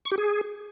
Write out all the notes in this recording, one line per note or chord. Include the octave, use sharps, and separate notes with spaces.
C#6
G4
G#4